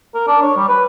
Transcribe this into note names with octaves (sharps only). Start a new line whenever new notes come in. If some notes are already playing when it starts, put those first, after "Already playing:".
A#4
D4
C#5
G3
B4